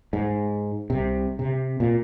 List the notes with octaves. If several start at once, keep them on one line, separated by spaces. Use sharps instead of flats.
G#2
C2 C3
C3
A#2